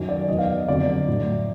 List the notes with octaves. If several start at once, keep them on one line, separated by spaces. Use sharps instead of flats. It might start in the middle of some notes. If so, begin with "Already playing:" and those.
Already playing: F#2 D#3 F#3
D5
E2 B2 F#3 D#5
F5
F2 D3 F#3 D5
A2 F#3